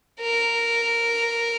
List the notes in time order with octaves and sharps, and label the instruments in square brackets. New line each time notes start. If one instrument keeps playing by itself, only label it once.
[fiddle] A#4